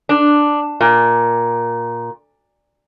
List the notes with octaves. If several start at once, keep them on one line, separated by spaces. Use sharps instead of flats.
D4
A#2